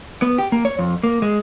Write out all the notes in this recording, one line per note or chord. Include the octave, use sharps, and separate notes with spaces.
B3
G4
A#3
C#5
F2
A#3
G#3